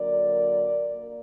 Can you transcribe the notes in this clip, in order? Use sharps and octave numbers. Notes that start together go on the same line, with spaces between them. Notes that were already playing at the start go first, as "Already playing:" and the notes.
Already playing: D3 F#3 A#3 A#4 D5
A#3